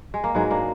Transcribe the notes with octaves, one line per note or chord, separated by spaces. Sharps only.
G#3
A#3
G#2 F#3 G#3 B3
A#3 D4